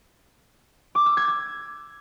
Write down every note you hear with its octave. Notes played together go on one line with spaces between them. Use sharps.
D6
E6
G#6
G#6